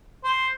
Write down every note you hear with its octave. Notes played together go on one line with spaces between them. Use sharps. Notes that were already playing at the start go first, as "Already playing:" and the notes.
C5